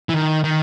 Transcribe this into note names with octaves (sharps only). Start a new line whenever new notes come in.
E3
D#3
D#3